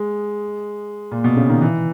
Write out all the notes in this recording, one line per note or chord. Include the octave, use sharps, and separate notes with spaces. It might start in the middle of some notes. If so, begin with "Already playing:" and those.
Already playing: G#3
A#2
B2
C#3
D#3
E3